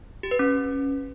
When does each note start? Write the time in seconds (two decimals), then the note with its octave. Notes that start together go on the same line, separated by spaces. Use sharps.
0.23 G4
0.31 B4
0.39 C#4